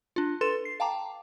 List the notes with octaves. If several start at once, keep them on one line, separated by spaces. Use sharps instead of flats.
D4 F4
A4 B4 C6 A6 E7
C7
F5 G5 A5 A#5 D6